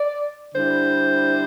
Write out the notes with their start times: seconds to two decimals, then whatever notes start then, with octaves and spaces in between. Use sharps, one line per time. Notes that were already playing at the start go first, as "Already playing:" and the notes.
Already playing: D5
0.55 D3 G3 E4 C5